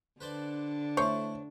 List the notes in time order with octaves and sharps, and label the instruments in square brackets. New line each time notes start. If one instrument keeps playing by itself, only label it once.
[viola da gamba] D3 D4 [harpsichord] B4 C5 D5
[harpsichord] A3 E4 [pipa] C5 C#5 [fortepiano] C#6